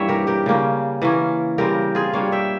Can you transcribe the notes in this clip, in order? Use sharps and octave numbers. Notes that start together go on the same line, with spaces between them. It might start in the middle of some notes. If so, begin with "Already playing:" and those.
Already playing: G2 E3 G3 A#3 C#4 C#5 E5
G4 A#4
G4 A#4
C#3 G3 A#3 C#4
E3 A#3 C#4
C#3 G3 C4 G4 A#4
F4 G#4
G2 G3 A#3 C#5 F5
E5 G5